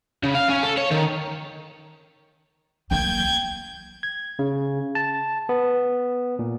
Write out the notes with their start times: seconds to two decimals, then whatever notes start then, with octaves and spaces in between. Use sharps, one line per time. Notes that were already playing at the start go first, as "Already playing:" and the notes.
0.24 C#3
0.35 F5
0.49 C#4
0.63 A4
0.77 C#5
0.91 D#3
2.91 F#3 A#3 G5 G6 G#6
4.03 G#6
4.39 C#3
4.95 A5
5.49 B3
6.39 A#2